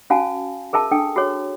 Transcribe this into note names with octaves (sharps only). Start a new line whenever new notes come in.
C#4 F#4 F5 G#5 A5
G#4 A#4 E5 A5
D4 A4 G5
F#4 G#4 C#5